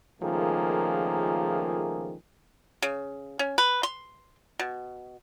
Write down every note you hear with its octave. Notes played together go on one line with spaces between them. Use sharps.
C#2 D#3 F3 A3 A#3 G#4
C#3
C#4
B4
C6
B2